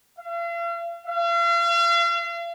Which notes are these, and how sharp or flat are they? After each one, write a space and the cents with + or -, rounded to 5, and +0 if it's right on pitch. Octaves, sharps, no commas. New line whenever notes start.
F5 -45
F5 -40